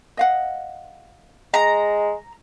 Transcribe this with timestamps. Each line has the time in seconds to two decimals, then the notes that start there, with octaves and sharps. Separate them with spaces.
0.17 D#5 F5 F#5
1.54 G#3 A#5